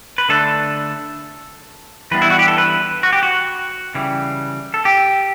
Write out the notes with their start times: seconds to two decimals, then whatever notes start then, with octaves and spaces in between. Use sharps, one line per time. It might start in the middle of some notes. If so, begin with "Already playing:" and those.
0.18 B4
0.29 D3 A3 D4 A4
2.11 E3 G3 B3 D4 B4
2.22 E4
2.30 F#4
2.39 G4
2.48 A4
2.58 B4
3.03 F#4
3.13 G4
3.23 F#4
3.95 C#3 E3 G3
4.74 A4
4.85 G4